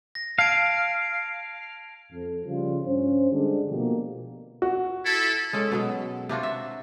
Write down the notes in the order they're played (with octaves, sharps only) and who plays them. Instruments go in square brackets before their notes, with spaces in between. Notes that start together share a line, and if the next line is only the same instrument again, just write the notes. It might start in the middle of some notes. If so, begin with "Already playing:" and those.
[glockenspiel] A#6
[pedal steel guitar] F5 [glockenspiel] A5 G#6 D7
[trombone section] F2
C#3 F3 G3 F4
G2 C#4 C5
D3 G3 G#3 D4
B2 F3 A3 A#3 G4
[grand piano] F#4
[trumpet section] E4 A4
[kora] G#3 C#4 A4
B2 F#3 G#3
C3 D4 F4 F#4
E5